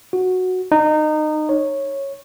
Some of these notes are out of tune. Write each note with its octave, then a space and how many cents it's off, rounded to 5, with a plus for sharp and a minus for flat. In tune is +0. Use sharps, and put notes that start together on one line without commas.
F#4 -5
D#4 -25
C#5 -10